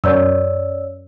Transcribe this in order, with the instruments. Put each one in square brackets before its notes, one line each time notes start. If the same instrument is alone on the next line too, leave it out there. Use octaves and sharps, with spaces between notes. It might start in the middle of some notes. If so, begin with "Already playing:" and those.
[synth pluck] F#2 [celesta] C#5 D5 E6